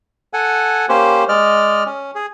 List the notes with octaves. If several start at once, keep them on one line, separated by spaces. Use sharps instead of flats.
A4 F#5 G#5
A#3 C#4 G4 C5
G#3 D5 D#5 F6
C#4
G#4